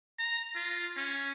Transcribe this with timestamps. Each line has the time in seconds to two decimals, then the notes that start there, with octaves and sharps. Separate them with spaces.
0.19 A#5
0.56 F4
0.96 C#4